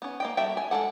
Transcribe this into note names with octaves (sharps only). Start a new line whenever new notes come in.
B3 C#4
A#3 D#5 G5
G3 F#4 A4 E5 G5
G#5
G#3 F#4 A4 F#5